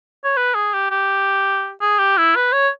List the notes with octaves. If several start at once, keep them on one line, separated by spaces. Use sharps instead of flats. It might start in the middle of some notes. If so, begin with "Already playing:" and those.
C#5
B4
G#4
G4
G4
G#4
G4
E4
B4
C#5